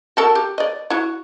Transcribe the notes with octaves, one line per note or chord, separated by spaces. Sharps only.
F#4 A4 A#4
G4
D5 D#5
E4 F#4